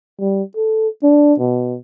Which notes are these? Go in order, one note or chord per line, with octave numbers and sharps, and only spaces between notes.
G3
A4
D4
B2